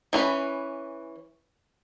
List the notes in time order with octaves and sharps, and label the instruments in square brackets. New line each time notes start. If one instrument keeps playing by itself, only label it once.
[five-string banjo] E3 C#4 B4